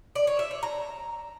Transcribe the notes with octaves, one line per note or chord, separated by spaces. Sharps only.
D5
C#5
E5
C#5
A#5